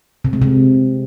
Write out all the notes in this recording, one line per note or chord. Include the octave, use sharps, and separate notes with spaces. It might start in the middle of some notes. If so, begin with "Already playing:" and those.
C3
G#3
C3